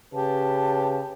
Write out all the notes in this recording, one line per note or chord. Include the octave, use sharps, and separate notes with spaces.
C#3 G4 B4 A5